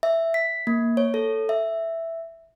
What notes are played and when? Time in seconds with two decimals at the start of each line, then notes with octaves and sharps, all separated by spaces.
0.03 E5
0.34 B6
0.67 A#3
0.97 C#5
1.14 A4
1.49 E5